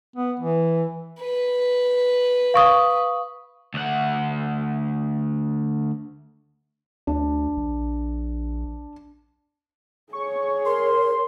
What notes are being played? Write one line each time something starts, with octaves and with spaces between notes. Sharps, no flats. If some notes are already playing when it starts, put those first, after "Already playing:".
B3
E3
B4
F5 C#6 D#6
D2 F#5
D2 D4
A#1
G#4 C#5 C#6
A#4 C6